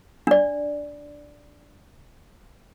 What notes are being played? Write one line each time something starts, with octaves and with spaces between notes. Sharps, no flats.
D4 D5